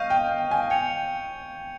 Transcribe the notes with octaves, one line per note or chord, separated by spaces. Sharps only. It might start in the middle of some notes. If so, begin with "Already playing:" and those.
Already playing: D#5 F5 C#6 G6 D#7
G5
G#5
G5 G#6 C#7 F7